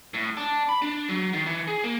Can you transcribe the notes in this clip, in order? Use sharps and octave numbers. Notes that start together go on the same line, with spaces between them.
A2
D4
B5
D4
F#3
D#3
E3
G#4
A#3